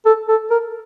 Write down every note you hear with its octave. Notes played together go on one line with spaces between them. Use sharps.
A4
A4
A#4